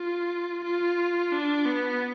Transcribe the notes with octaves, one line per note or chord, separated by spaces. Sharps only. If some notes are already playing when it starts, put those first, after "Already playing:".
Already playing: F4
F4
D4
B3